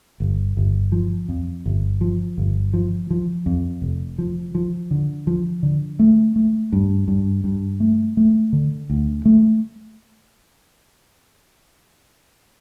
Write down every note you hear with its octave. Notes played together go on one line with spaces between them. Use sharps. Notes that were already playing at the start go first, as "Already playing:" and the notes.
G1
G1
F3
F2
G1
F3
G1
F3
F3
F2
F1
F3
F3
D3
F3
D3
A3
A3
G2
G2
G2
A3
A3
D3
D2
A3